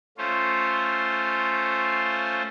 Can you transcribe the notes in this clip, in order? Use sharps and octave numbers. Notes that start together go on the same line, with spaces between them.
A3 C#4 F4 C5